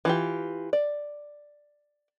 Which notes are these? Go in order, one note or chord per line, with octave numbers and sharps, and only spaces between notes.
E3 F4 G4
D5